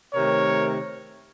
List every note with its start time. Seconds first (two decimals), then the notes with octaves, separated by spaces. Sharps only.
0.14 C3 D#3 A3 A#4 C#5